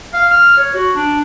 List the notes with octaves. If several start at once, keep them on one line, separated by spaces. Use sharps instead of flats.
F5
F6
C#5
F#4
D4